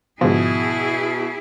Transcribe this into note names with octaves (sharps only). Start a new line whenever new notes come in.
G#2 B2 D3 F3 E4 G#4